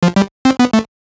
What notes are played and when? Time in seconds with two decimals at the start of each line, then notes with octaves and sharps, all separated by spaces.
0.03 F3
0.16 G3
0.45 C4
0.59 B3
0.73 A3